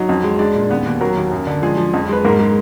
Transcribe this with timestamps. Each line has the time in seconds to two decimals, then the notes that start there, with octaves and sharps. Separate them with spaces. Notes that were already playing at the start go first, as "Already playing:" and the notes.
Already playing: F#3 D#4 D#5
0.09 F2
0.24 G#3
0.39 G#3 D4 D5
0.55 A#2
0.70 D#2 B3 B4
0.86 D#2
1.01 F#3 A#3 A#4
1.17 D#2
1.31 F#2
1.47 D3
1.62 F3 G#3 G#4
1.77 F3
1.94 F2
2.09 G#3 B4
2.25 G#2 A#3 A#4
2.39 G#3